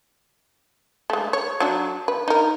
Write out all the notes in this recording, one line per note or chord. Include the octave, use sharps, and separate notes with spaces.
G#3 A3
C#5
F#3 D4 F#4
B4
D#4 A#4